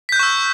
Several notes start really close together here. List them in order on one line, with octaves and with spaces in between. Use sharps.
B6 G6 F#6 C#6 E6